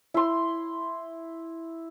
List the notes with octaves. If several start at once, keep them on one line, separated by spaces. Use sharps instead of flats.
E4 C6